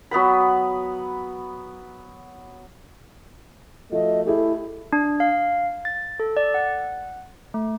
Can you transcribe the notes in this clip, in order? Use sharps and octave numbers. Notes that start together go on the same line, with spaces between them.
F#3 B3 B4 B5
F3 A3 F#4 D#5
A3 E4 G4 G#4 E5
D4
F5
A6
A4
D5
F#5
A3